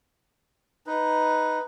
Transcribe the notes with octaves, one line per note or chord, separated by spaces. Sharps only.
D#4 B4